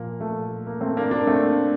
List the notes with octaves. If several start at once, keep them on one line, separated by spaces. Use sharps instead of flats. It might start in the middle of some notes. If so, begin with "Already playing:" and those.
Already playing: A#2 F3 A#3
A3
A#3
A3 C4
A#3 D4
A#3 D4
A3 C4